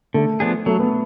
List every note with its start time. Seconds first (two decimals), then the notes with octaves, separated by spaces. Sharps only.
0.14 D3 A3
0.40 F3 B3 D4 G#4
0.66 F#3 A3
0.79 B3